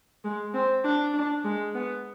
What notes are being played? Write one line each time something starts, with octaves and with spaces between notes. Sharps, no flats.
G#3
C4
D4
D4
G#3
B3